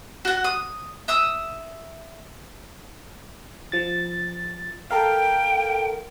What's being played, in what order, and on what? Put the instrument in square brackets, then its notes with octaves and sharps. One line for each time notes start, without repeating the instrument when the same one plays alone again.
[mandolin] F#4 F#5
D#6
E5 D#6 E6
[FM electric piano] F3 A6
[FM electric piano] A4 A#4 F5 [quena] G5